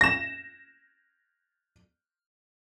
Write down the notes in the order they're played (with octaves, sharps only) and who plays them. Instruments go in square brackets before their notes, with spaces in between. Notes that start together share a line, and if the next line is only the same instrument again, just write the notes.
[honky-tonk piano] A#6 E7